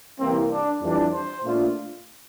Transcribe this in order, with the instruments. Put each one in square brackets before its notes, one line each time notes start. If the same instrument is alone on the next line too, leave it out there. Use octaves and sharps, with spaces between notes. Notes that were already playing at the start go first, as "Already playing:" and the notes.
[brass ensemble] C2 C3 E3 G3 A#3 [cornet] C4
[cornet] D4
[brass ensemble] F2 E3 G3 D4
[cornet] C5
[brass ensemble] A#2 A3 D4 F4